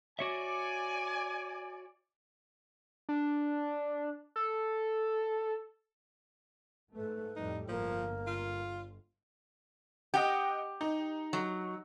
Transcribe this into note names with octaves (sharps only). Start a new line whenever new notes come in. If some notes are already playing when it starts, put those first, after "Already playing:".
F#4 C#5 D5 E5 G#5
D4
A4
G#2 A3 B4
F2 A2 G3 D#4
G1 F3 A#3
F4
G4 D#5 F#5 G5
D#4
F#3